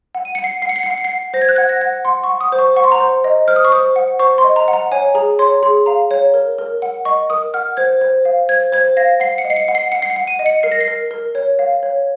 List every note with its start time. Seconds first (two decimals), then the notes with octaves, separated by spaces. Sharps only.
0.15 F#5
0.25 D#7
0.35 F#5 C#7
0.44 C7
0.62 F#5 C7
0.69 C#7
0.76 C7
0.83 C#7
0.86 F#5 C7
0.98 C#7
1.04 C7
1.10 F#5
1.34 C5 A#6
1.42 G#6
1.49 F#6
1.56 F#5 G#6
1.69 A#6
1.81 F#5
2.05 F#5 C6
2.24 C#6
2.29 F#5
2.41 D#6
2.52 C5
2.59 C#6
2.76 F#5 C#6
2.84 C6
2.92 A#5
2.98 C5 C6
3.24 D#5
3.48 C5 F6
3.56 D#6
3.65 C#6
3.72 C5 D#6
3.96 F#5
4.19 C5 C#6
4.38 C6
4.44 D#5
4.56 A#5
4.68 F#5
4.73 A#5
4.92 C#5 G#5
5.15 G#4 A#5
5.39 C#5 C6
5.63 G#4 C6
5.86 F5 A#5
6.11 C#5
6.34 A#4
6.58 A#4
6.82 F#5
7.05 D#5 C#6
7.30 A#4 D#6
7.54 F#5 F6
7.77 C5 G#6
8.01 C5
8.25 F5
8.49 C5 G#6
8.72 C5 G#6
8.97 F5 A#6
9.20 F#5 C7
9.38 C#7
9.44 D#5
9.50 C7
9.56 C#7
9.68 F#5
9.75 C7
9.92 F#5 C#7
10.02 C7
10.10 C#7
10.16 F#5
10.27 D#7
10.39 D#5
10.46 C#7
10.63 A#4 C7
10.72 A#6
10.81 C7
10.88 A#4
11.11 A#4
11.35 C#5
11.59 F5
11.83 C#5